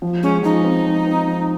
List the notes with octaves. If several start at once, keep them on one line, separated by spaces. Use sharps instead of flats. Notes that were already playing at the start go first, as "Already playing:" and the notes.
F3
G#3 C#4
F3 D#4
C4
F3
C4
F3